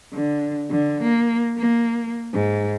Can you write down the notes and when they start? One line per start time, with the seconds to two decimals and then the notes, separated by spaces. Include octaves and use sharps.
0.14 D3
0.71 D3
1.03 A#3
1.59 A#3
2.33 G#2